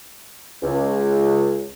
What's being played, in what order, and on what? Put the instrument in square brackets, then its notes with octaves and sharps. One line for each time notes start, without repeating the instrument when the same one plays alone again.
[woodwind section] C#2